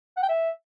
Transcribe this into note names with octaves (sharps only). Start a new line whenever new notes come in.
F#5
G5
E5